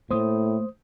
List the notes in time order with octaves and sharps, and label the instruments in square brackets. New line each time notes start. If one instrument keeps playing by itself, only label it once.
[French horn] A2 [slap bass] A3 A#3 [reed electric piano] C5 D#6